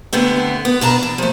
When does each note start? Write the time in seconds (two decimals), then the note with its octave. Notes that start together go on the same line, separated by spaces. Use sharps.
0.13 D3 A3 B3 C4
0.65 B3
0.81 B2 D4 A5 A#5
1.03 E3
1.18 F3 A3